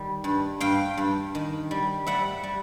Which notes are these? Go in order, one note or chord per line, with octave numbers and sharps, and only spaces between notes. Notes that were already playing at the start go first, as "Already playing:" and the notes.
Already playing: D#3 G3
G2
G2 F5 G5
G2
D#3
G3
G3 E5 F#5
G3